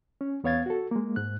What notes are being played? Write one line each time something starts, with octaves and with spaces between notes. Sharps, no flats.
C#4
E2 B3 C#5 F5 G#6 A6
F#4 A4
G#3 A#3
G#2 F#6